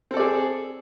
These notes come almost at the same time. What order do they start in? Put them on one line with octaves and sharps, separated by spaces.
C4 A4 D5 G#4